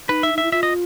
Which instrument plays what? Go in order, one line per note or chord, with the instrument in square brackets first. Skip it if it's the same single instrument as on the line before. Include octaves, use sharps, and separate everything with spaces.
[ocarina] D#4 [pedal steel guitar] B4
[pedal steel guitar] E5
[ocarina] D#4 [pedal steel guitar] E5
[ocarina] E4
[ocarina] F4 [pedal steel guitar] E5
[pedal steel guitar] D#5